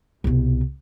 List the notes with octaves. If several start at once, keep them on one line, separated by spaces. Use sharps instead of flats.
C2 B2